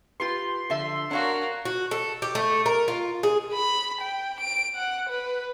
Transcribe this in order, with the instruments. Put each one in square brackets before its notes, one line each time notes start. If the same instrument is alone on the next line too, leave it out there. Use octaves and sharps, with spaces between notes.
[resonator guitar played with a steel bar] F4 G4 B4 [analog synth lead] C6
[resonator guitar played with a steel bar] D3 F3 E5 [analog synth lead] C6
[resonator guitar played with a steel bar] D4 C#5 F5 [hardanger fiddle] F#4 A#4
[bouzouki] F#4
A4
G4
A3
A#4
F4
G#4
[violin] B5
G5
D7
F#5
B4